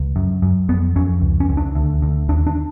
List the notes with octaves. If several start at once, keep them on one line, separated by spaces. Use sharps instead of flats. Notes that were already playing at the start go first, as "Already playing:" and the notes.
Already playing: C#2
F#2
F#2
F2 B3
F2 C#4
C#2
C#4
C#2
D4
D2
D2
D#2 D4
D4